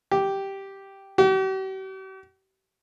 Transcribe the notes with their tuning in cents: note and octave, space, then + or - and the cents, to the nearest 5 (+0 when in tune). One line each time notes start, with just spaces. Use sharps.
G4 -5
G4 -45